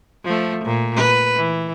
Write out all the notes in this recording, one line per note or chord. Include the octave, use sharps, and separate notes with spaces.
F3 A3
A#2
B4
E3